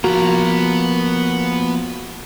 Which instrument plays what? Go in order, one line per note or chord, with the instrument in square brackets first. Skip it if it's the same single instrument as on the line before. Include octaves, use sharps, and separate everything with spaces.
[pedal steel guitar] F3 A#3 [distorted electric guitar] B3 A#5 [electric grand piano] F#4